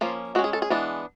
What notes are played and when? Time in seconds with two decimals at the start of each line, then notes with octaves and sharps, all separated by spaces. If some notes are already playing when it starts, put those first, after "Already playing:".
0.01 F3 A#3 C#4 F4
0.35 G#3 F#4
0.39 C#4
0.44 G#4
0.53 A4
0.62 G#4
0.70 E3 G#3 B3 D4